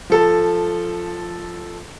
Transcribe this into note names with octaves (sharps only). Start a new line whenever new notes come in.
F3 A4 A5